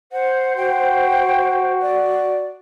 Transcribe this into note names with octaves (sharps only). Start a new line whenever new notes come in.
C5 F#5
F#4 G5
D5